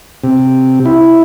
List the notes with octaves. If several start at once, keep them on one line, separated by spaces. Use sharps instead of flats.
C3
E4